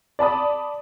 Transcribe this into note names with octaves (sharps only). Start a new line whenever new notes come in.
D5 A5 B5 D#6